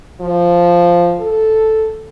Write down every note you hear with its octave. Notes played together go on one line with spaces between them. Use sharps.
F3
A4